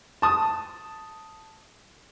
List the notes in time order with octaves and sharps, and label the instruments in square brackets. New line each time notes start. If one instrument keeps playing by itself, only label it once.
[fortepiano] A5 D#6